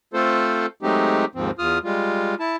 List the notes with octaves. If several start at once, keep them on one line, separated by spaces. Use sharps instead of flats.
A3 C4 F4 A4 C5
F#3 G#3 A3 C4 D#4 G4
D#2 G#2 F3 C4
E2 F4 D#6 F6
G3 G#3 F4
E4 A5